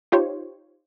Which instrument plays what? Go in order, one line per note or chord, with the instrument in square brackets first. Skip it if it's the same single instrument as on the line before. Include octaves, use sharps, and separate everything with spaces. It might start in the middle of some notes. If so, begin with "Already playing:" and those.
[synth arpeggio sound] D#4 F4 G4 C5 C#5